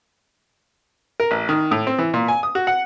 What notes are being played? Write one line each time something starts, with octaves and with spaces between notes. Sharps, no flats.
A#4
A1
D#3
A2
C4
E3
A#2
G#5
D#6
F#4
F#5